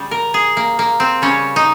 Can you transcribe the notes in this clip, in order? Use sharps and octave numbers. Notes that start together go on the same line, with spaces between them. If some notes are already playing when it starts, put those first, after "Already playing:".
Already playing: C#3 G3
A#4
G#4
A#3
A#3
C4
C#3 G3 C#4
D#4